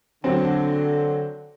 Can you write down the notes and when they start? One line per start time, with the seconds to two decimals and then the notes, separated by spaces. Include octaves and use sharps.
0.24 D3 F#3 C4